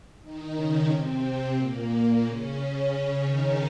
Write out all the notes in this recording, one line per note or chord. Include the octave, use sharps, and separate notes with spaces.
D#3 D#4
C#3 C#4
C3 C4
A#2 A#3
C#3 C#4
C#3 C#4
D#3 D#4